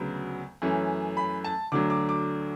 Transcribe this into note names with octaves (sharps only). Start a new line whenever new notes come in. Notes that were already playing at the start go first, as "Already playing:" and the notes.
Already playing: D2 C#3 F#3 B3
F#2 E3 A3 C#4
B5
A5
D2 D3 F#3 D6
D6
D6